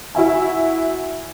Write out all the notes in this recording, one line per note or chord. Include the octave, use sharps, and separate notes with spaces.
E4 F#4 E5 G#5